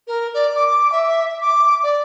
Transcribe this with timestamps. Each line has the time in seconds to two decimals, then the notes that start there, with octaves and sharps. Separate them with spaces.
0.07 A#4
0.34 D5
0.55 D6
0.91 E5
1.41 D6
1.83 D5